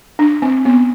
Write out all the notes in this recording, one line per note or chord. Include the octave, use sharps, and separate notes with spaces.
D4
C4
B3